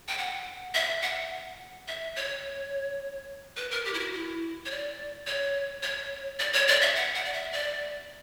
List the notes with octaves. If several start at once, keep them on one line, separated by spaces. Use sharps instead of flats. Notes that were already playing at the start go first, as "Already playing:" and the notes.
G5
F#5
E5
F#5
E5
C#5
B4
A#4
G4
E4
F#4
E4
C#5
D5
C#5
C#5
D5
C#5
D5
E5
F#5
F#5
D5
E5
D5